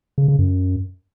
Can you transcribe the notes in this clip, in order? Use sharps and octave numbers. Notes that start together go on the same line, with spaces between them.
C#3
C#3
F#2